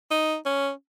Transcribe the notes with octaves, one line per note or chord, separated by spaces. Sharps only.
D#4
C#4